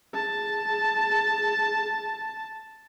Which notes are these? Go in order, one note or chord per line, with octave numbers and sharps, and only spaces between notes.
G#4 A5